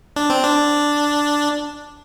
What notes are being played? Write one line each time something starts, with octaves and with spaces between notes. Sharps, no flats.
D4
C4
D4